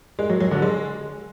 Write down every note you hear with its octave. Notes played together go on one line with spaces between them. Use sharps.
G#3
F#3
F#3
D3
G#3